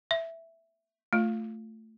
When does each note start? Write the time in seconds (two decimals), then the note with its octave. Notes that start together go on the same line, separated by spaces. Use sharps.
0.11 E5
1.13 A3 F4